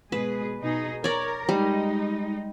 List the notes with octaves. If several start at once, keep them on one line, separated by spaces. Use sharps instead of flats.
B2 G#3 G#4 B4
B2 D#4 G#4
A#4 C#5 D5
G3 G#3 D#4